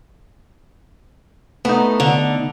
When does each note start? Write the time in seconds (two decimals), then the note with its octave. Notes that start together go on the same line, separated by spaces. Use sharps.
1.65 A3 B3 D#4
2.00 D3